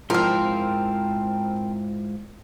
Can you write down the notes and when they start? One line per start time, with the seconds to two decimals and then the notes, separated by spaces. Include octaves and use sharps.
0.10 G#2 F3 C4 E4 F4 A#4 F6